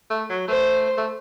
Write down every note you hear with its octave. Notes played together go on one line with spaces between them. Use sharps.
A3
F#3
A3 C5
A3